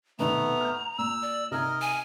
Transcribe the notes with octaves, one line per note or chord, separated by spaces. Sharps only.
F1 B2 D#3 A3 B3 A#5
F6 G6
A#2 E6
D5
C3 D#4 A#4 D#5 F6 G#6
G#5